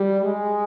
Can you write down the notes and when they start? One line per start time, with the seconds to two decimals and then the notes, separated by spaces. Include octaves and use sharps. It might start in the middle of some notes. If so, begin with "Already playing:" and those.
Already playing: G3
0.22 G#3